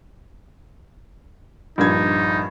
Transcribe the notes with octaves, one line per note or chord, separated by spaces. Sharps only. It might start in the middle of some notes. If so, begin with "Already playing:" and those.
A#1 G2 D#4 G#6